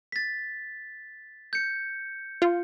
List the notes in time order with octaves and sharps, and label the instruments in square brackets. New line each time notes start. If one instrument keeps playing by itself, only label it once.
[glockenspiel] A6 B6
G6 C#7
[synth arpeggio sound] F4